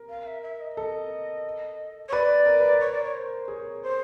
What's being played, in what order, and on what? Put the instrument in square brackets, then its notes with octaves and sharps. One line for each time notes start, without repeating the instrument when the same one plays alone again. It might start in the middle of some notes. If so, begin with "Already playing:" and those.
Already playing: [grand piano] A#4
[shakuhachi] F5
E5
E5
D#5
[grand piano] A4
[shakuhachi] C#5
[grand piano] B4 [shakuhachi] D5
[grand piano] A#4
B4
A#4
[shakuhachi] C#5
D5
C#5
C5
[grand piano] G#4 [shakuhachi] C#5
[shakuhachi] C5